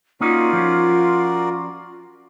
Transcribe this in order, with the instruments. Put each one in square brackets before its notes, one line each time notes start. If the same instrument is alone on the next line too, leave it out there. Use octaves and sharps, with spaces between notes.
[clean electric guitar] A#3 C#4 D#4 [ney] F4 [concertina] F#4 A#4 D5
[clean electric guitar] F3 C#4